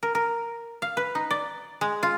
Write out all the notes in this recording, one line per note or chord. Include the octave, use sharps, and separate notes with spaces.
A#4
A#4
F5
B4
D#4
D5
G#3
F4